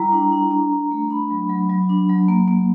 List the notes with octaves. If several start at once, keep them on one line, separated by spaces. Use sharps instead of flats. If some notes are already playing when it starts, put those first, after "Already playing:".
Already playing: G3 E4 A#5
D4
D4
D4
D4
A3
D4 B5
F#3
F#3
F#3
D4
F#3
A#3
A#3